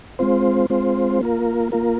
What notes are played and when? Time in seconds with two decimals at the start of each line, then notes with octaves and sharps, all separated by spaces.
0.19 G#3 C4 F4 C5
0.70 G#3 C4 F4 C5
1.21 A#3 F4 A#4
1.72 A#3 F4 A#4